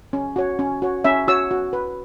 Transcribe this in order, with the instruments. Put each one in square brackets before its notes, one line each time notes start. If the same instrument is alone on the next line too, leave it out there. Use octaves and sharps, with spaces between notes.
[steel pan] C#4
F#4 C#5
C#4
F#4 C#5
C#4 E5
F#4 C#5 E6
F#4
B4